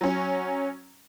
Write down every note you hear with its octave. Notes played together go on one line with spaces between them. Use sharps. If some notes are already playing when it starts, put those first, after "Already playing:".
F#3 C#4